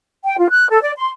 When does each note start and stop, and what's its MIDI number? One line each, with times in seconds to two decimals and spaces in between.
0.25 0.37 79
0.39 0.47 65
0.50 0.69 90
0.70 0.80 69
0.82 0.92 74
0.98 1.10 84